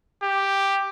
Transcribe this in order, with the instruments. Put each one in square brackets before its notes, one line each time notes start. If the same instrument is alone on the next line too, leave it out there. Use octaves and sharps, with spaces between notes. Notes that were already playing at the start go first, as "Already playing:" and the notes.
[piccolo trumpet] G4